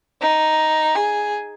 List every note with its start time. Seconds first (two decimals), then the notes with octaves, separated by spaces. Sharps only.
0.22 D#4
0.95 G#4